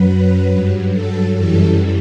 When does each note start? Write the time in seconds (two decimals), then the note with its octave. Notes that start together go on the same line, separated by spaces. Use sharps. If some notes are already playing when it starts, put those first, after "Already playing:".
Already playing: F#2 F#3 B4
0.52 G2 F#3
0.93 A4
1.35 F#2 E3 G3 A4